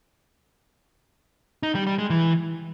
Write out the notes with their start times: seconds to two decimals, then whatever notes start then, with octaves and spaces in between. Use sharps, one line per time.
1.63 D#4
1.75 G3
1.87 G3
1.98 G#3
2.10 E3